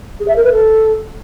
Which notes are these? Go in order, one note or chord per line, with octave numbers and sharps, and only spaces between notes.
G#4
E5
A#4
B4
A4